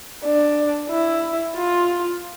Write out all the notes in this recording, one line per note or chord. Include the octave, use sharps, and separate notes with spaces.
D4
E4
F4